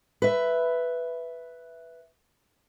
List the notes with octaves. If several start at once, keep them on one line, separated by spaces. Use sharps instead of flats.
B4 E5